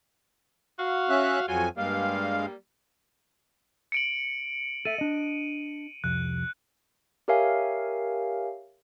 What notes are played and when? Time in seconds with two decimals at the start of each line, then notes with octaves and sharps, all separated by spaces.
0.79 F#4 F5
1.10 C#4 E5 F#6
1.48 F2 F#3 F4 F#4 G#5
1.78 G2 G3 G#3 A#3 F5
3.92 C#7 D7 F#7
4.85 A4 E5 D#7
4.98 D4 D#5
6.04 C2 F2 F#6
7.28 G4 A#4 C#5 E5 F5 G#5